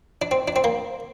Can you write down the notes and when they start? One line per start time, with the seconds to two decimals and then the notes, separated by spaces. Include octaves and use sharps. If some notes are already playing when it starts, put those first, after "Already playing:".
0.22 D4
0.31 C4
0.48 D4
0.56 C4
0.64 A#3